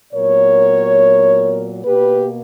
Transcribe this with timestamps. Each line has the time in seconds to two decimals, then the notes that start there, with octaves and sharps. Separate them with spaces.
0.13 A#2 F#3 B3 A#4 C#5
1.85 B2 A#3 G4 B4